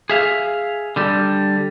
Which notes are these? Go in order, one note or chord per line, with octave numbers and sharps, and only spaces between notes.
G#4 E5 F5
D3 G3